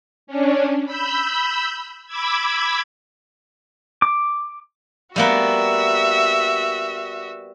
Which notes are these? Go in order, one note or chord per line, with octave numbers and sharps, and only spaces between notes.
C#4 D4
B5 E6 G6
B5 D6 E6 G#6
D6
G3 A#3 B3 F#4 E5